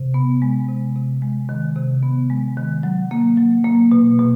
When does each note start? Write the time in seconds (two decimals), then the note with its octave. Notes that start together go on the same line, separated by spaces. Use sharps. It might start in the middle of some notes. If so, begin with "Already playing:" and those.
Already playing: C3
0.14 B3
0.42 G#3
0.68 C3
0.96 C3
1.22 G#3
1.49 D#3
1.76 C3
2.03 B3
2.30 G#3
2.57 D#3
2.83 F#3
3.11 A#3
3.38 F#3
3.64 A#3
3.91 B2
4.19 B2